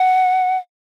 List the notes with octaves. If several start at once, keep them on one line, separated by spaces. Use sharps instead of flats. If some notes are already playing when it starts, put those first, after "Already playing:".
Already playing: F#5